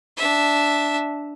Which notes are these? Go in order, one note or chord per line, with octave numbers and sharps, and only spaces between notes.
D4 E5